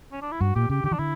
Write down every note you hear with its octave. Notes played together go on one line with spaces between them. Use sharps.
C#4
D4
E4
G2 F#4
A#2 G4
C#3 G4
D3 G4
E3 D4
D3 E4